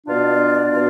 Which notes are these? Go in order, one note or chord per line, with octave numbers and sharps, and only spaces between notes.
B2 B3 D4 F4 D5
B2 B3 F4